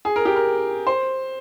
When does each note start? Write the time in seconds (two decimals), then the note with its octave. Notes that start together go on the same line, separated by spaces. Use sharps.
0.05 G#4
0.16 A#4
0.25 G4
0.36 A#4
0.87 C5